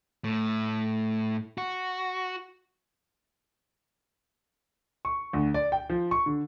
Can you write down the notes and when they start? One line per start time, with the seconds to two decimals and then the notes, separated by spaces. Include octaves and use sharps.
0.24 A2
1.58 F#4
5.05 C#6
5.33 D2
5.54 D5
5.72 G5
5.89 F3
6.11 C#6
6.26 D3